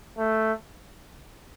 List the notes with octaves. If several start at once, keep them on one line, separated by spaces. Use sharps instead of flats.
A3